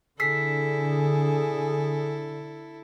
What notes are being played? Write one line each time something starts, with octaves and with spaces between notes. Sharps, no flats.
D3 E4 G#4 A4 E6 B6 C7